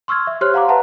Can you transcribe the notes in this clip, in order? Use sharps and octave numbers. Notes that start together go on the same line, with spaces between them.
C6 C#6 E6 F6 G#6
E5
G4 C5 C#5 C6 F6 F#6
F5 F#5 A#5 C6 D6
B4 E5 F#5 A5 A#5